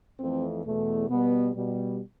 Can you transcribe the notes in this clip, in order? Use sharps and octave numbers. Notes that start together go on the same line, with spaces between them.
F2 E3 A3 C4
E2 B2 A3
B2 G3 B3
B2 G3